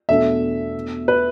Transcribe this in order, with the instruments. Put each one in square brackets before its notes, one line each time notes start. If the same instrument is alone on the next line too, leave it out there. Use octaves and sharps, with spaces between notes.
[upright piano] E2 B2 A3 D4 A4 [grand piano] E5
[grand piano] B4